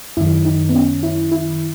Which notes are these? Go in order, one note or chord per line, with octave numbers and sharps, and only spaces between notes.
F#2 D#3 E4
D#4
B3
C#4
E4
E4